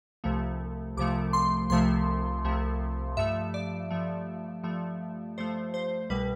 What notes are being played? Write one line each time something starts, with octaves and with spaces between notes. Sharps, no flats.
C2 C3 F3 A3
C2 C3 F3 A3 D6
C6
C2 C3 F3 A3 C6
C2 C3 F3 A3
G2 F3 A3 E5
D5
G2 F3 A3
G2 F3 A3
G2 F3 A3 C5
C5
C2 B2 G3 B4